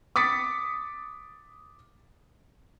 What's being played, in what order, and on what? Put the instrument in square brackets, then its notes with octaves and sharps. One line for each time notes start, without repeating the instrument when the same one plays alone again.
[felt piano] D6 D#6 A6 B6 C#7